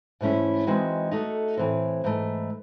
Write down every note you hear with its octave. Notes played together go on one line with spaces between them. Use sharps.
G#2 E3 A3 C#4 E4
E3 G#3 C4 D#4 F#4
A3 D#4 F#4 A4
A2 E3 C4
G#2 E3 A3